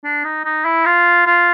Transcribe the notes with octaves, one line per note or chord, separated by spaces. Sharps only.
D4
D#4
D#4
E4
F4
F4